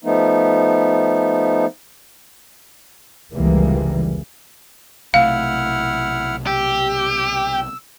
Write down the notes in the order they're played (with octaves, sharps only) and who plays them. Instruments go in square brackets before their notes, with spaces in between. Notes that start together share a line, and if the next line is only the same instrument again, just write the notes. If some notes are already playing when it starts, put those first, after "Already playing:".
[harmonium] F3 A3 B3 D#4
[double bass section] F1 C#2 E3 G3 G#3 A#3
[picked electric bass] B1 C3 A3 [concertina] E4 F#5 F6 [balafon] F5
[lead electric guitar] G4 [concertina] E6